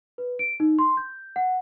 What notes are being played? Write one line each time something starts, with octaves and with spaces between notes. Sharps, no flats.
B4
D7
D#4
C6
G6
F#5